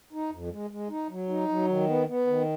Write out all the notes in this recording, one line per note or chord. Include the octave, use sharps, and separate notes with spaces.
D#4
F2
G#3
G#3
D#4
F#3
D#4
F#3
D#3
B3
B3
D#3